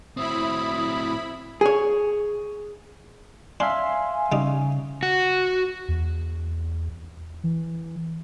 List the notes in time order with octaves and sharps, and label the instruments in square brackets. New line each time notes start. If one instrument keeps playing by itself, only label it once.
[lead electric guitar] A2 C4 [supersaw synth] E4 B5 [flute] D#6
[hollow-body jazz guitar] G#4 C#5
[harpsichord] D4 [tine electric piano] E5 F5 C6 [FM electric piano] G#5
[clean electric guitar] C#3 [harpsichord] G3 D#4
[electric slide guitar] F#4
[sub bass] E2
E3